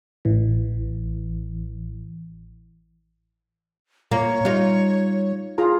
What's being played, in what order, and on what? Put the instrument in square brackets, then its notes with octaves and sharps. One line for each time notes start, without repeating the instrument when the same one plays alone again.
[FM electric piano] A1 E3
[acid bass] A#2 [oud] A#3 [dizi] C#5
[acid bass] G3 [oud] D#4 F4
[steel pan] F4 G#4 A#5